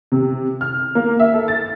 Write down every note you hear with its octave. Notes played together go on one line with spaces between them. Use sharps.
C3
F6
A#3
E5
A4
A6